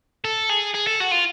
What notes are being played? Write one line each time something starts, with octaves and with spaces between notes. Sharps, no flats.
A4
G#4
G#4
A4
F#4
F4